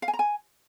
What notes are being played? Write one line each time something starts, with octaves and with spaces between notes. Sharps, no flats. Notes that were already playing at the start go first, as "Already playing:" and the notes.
F5
G#5
A#5
G#5